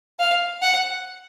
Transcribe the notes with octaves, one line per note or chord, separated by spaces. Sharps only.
F5
F#5